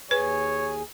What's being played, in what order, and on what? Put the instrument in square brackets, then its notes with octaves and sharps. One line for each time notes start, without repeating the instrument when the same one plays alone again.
[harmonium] D#2 G#4 G#5 [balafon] B4 [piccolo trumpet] C#5